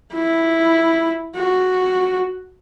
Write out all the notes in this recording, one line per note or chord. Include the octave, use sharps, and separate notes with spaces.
E4
F#4